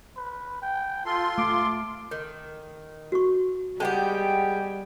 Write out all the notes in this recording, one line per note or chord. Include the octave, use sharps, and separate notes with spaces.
B4
G5
F4 A4 C6
A3 D6
D#3
F#4 C#6
G3 G#3 B3 G4 G5 A5